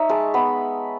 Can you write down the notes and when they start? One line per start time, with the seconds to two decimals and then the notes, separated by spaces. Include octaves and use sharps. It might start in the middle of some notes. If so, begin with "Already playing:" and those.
Already playing: D#4 C#5 E5
0.09 G#3 A5
0.34 B3 B5